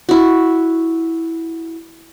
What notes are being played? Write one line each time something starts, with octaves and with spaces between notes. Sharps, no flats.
E4 F#4